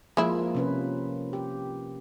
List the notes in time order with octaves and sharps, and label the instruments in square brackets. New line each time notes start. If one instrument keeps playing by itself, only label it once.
[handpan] F3 A#3 F4 [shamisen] G#3 E4
[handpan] C3 C#4 B4
G4